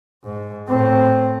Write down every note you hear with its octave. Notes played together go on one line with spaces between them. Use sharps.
G#2
A2 C4